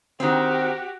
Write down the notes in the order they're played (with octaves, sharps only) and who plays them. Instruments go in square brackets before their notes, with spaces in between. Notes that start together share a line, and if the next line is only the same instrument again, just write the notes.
[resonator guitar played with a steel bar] D#3 C4 [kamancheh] F#4 G4